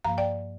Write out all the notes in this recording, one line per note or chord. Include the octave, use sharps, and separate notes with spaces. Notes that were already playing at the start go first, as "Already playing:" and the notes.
G2 F3 A#3 F5 A#5
D5 G5